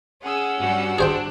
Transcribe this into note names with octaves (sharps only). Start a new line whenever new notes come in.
C#4 G#4 F#5 E6
G2 G3 F#4
D4 G#4 C5 G5